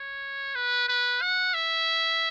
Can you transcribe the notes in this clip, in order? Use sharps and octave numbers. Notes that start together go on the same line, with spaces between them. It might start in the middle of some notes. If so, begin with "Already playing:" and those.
Already playing: C#5
B4
B4
F#5
E5